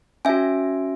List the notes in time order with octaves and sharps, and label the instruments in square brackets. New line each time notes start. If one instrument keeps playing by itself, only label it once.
[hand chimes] C#4 F#4 E5 G#5